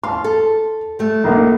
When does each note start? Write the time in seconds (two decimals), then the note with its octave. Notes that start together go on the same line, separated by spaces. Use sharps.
0.03 F5 A5 C6
0.24 A4
0.99 G3 A3
1.24 A#1 A#3 D#4